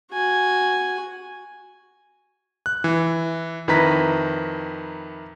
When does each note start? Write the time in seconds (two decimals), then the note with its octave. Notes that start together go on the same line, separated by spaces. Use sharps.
0.12 F#4 G#5
2.66 F#6
2.84 E3
3.68 F2 D#3 E4 B4 A#5 B6